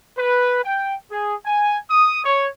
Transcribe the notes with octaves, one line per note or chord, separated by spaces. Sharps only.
B4
G5
G#4
G#5
D#6
C#5